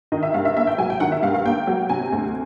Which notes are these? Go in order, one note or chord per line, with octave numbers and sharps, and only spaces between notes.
D#3 D#5
E5
G2 F5
E5
A#3 E5
G5
F#3 G#5
G5
D#3 F#5
E5
G2 F5
F5
A#3 G5
F#3
C3 G#5
D2